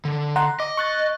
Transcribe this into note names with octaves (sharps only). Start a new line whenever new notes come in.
D3
F#5 A#5 C6
D#5 D6
C#6 F#6 A6